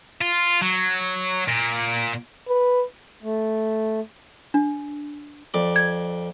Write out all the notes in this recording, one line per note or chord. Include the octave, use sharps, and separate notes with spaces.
F4
F#3
A#2
B4
A3
D4
F2 D5
G#6